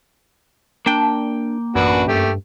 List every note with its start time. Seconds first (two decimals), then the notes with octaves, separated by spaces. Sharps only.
0.86 A#3 D4 G5
1.75 A1 F#2 D4 F#4 B4
2.08 G2 A3 G4